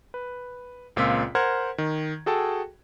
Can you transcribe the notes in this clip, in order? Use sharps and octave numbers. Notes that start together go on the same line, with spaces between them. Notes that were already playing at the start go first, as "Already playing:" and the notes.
B4
C#2 A#2 C4 F4 E6 B6
A#4 C5 F#5 F6 G#6
D#3
F#4 G#4 A4 G5 A5